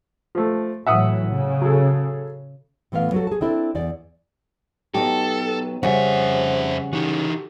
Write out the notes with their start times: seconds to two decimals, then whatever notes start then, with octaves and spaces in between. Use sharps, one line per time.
0.35 F3 A3
0.87 A2 E3 F#3 E5 F#5 D#6
1.30 C#3
1.62 F#3 G#4 A4
2.92 A2 E3 A3 B3 F5
3.12 F#3 F#4 A4
3.27 G#4 A5
3.41 C4 D4 E4 A4
3.75 E2 D5
4.94 F#3 B3 D#4 G4 A4
5.83 F2 C#3 G3 C5 E5 F#5
6.93 E3 D#4 F#4 G4 A4